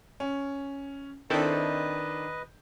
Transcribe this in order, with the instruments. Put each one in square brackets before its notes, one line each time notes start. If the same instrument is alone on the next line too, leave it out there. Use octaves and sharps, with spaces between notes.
[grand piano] C#4
[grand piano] D#3 D4 [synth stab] C4 E4 A4 [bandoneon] B4 D#5